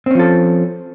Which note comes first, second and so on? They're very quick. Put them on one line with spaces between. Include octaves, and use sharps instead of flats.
C4 C#4 F3 A4